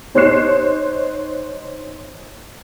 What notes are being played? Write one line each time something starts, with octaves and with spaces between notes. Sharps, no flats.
D#4 C5 C#5 F#6 C7 E7